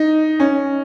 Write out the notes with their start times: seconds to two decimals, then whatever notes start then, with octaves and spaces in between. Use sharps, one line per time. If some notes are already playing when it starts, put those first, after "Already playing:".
Already playing: D#4
0.40 C#4